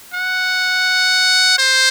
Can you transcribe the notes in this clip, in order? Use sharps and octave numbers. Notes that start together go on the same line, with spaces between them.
F#5
C5